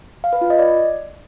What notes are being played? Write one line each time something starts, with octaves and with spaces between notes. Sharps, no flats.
F5
B4
F4
D#5
D5